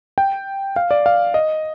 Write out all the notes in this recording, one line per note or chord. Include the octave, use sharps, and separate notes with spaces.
G5
F5
D5
F5
D#5